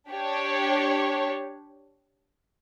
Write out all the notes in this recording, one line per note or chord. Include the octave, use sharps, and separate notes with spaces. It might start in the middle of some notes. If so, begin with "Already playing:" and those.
D4 G4 C#5